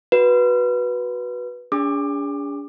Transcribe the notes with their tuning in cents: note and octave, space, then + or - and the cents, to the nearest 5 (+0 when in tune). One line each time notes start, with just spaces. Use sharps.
F#4 -5 B4 -10
D4 -40 G#4 -30 D6 +25